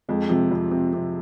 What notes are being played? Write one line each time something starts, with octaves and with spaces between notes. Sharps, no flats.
F2 G#3
C3 F3
F2
C3
C3